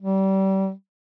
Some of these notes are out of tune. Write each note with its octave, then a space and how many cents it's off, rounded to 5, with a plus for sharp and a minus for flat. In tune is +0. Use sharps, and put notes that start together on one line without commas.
G3 -30